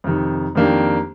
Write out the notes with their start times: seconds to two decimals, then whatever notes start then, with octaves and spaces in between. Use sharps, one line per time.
0.04 F2 C3 D#3
0.55 F2 D#3 A#3 D4 G4